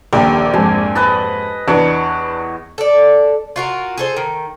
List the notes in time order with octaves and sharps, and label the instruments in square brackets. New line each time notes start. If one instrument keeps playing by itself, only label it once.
[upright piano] D#1 [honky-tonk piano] A#1 [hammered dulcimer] G4
[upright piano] F2 G#2 [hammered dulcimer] G#5
[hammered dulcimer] B4 D#5 A5
[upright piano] E2 [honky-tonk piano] D4 B4 [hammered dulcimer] C#5
[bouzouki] A4 D5
F4 F#4 A#4
G#4 A4 C5
D#3